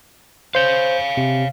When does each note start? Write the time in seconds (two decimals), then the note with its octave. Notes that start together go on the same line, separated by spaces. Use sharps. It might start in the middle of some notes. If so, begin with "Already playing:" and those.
0.55 C5 C#5 F5 G6
1.17 C3